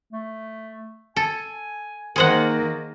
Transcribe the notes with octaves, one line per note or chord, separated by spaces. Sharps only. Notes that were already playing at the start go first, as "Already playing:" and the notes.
A3
A4 G#5
D#3 A#3 G#4 A#4 C5 F#5